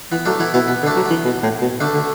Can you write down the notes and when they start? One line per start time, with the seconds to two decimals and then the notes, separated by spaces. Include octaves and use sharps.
0.11 E3 B3
0.25 F#3 A3 D4
0.39 E3 B3 E4
0.54 B2 B3 E4
0.68 B2 B3
0.83 D3
0.86 A3 D4
0.96 F#3
1.05 E3 B3
1.25 B2
1.43 A2
1.61 B2
1.80 D3 A3 D4
1.94 D3